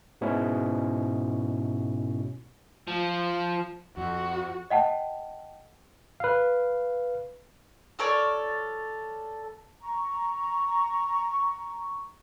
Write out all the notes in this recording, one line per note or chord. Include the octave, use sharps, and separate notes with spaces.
G#2 B2 C#4 E4
F3
F2 F#4
D#5 F#5 G5 A5
B4 F5
F4 A4 C#5 D5
A#5 C#6